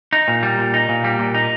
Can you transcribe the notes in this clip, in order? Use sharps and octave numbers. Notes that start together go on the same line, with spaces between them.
D#4
A#2
G3
A#2
D#4
A#2
G3
A#2
D#4